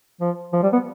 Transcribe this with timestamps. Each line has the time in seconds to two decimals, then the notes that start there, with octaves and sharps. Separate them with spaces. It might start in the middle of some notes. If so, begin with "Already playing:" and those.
0.21 F3
0.53 F3
0.63 G3
0.73 B3